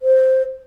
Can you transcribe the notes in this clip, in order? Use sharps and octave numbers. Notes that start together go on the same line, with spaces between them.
C5